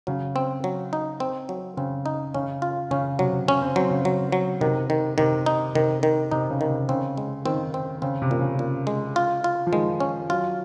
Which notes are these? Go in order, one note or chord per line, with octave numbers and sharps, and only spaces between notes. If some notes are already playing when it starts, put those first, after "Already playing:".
C#3 F#3
C4
F#3
D#4
C4
F#3
C#3 C4
D#4
C#3 C#4
F4
C#3 C#4
C3 F#3
C#3 C#4
C4
F#3 C4
C#3
F#3
F#3
C3 D#3
D#3
C3 D#3
D#4
C3 D#3
D#3
C3 D#4
C#3
D#3
C3
C#3 C4
G#3
D#3 C4
C4
C#3 C4
C3
A#2
C#3
A#2
G#3
F4
F4
F3
D#3 G#3
C#4
F#3 F4